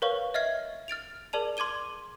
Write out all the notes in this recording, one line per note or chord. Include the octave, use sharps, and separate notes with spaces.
A#4 B4 C#5 F5 C#6
D#5 E5 F6 G#6 C7
F6 A6 D7 F7
G#4 A#4 D5 A5 F7
C6 D6 G#6 D#7 G7